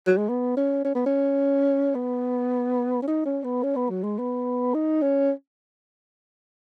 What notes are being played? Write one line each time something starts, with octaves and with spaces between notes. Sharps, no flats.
F#3
G#3
B3
C#4
C#4
B3
C#4
B3
C#4
D#4
C#4
B3
C#4
B3
F#3
G#3
B3
D#4
C#4